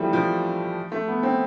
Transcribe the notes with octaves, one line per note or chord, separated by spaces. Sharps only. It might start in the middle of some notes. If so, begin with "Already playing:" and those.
Already playing: E3 F3 G3 A3
F3
A3
B3
C4